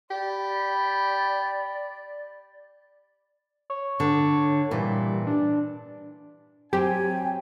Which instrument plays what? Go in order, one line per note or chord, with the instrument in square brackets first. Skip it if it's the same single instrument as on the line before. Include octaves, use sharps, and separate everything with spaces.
[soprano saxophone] G4 [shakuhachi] D5 [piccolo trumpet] B5
[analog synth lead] C#5
[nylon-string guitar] D3
[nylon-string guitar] A#2 E3 [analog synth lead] G3
[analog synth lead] D4
[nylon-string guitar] F#3 C4 C5 [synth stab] G4 [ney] G5 [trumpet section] G#5